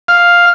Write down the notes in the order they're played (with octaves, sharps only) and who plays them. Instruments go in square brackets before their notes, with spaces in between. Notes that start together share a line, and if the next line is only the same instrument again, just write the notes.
[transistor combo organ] F5